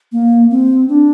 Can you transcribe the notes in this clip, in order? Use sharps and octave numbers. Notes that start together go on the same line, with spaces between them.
A#3
C4
D4